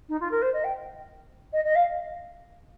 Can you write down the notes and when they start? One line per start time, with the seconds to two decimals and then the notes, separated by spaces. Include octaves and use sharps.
0.09 D#4
0.20 F4
0.31 A#4
0.42 C5
0.53 D#5
0.64 G5
1.53 D#5
1.64 D#5
1.75 F5